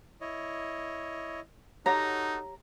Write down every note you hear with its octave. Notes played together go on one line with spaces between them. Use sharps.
E4 C#5 D#5
D#4 F#4 G4 A4 C#5 F#5 A#5